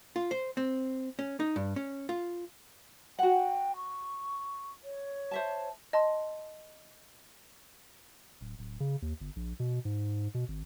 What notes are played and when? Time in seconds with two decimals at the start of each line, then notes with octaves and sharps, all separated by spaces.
0.16 F4
0.31 C5
0.57 C4
1.19 C#4
1.40 D#4
1.56 G2
1.76 C#4
2.09 F4
3.19 F#4 F#5 G5
3.76 C#6
4.84 C#5
5.31 C5 E5 A5
5.93 D#5 A5 C6
8.41 D1
8.59 D1
8.80 C#3
9.02 D#2
9.21 G1
9.36 A#1
9.60 B2
9.85 G#2
10.34 B2
10.48 G#1